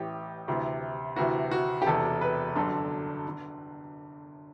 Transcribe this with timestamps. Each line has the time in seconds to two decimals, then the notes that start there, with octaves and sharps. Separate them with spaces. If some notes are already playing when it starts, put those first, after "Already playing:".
Already playing: A1 A2 E3 G4
0.48 D2 C3 E3
1.16 D2 C3 E3 F#4
1.51 F#4
1.82 G4
1.86 E1 E2 C3 A4
2.21 B4
2.55 G1 F#2 D3 A4
3.28 D3